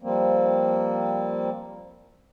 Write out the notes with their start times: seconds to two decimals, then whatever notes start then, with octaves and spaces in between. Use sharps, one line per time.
0.03 F3 G3 A#3 C4